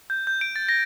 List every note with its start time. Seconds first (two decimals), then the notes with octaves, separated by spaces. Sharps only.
0.10 G6
0.27 G6
0.41 D7
0.56 A6
0.69 A#6